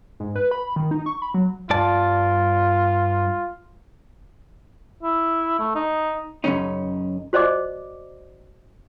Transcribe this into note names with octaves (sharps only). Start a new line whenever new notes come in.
G#2
B4
B5
D#3
D#4
C#6
B5
F#3
G2 F4 D5 A5
E4
A3
D#4
F#2 A2 C#3 C#4 D#4
F#4 C5 D5 D#5 D6